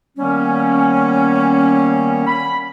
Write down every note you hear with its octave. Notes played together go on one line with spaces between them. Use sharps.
D#3 G3 A#3 B3 C#4
B5